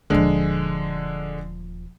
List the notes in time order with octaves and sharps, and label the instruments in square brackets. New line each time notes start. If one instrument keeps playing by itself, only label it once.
[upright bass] D#1 F3 [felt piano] D3 G#3